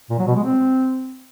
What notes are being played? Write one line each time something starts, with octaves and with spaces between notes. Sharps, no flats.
A#2
F#3
B2
G#3
C4